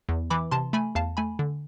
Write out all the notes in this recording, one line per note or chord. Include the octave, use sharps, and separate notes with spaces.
E2
E3 B5 D6
C3 A5 C6
A3 G#5 B5
E2 F5 A5
A3 G#5 B5
D3